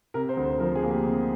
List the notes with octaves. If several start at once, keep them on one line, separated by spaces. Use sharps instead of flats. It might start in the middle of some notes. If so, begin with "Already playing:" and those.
C3 A#4
C5
D2
C5
F3 A#4
G#4
A#3
G4
C3